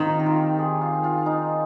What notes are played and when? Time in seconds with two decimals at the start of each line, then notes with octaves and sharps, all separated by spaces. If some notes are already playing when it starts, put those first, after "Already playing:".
Already playing: D#3 C4 D#4 F4
0.19 G4
0.26 F4
0.58 G#4
0.81 F4
1.04 F4
1.26 D#4